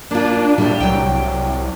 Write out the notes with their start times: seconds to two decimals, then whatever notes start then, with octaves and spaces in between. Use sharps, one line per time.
0.11 A#3 D4 F4
0.58 A2 G3 G4
0.80 C2 F#3 G5